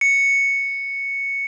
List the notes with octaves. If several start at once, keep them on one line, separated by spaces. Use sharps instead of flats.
C#7